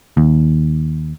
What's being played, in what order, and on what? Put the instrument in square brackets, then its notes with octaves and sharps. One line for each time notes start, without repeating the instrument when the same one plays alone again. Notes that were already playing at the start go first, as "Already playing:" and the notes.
[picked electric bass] D#2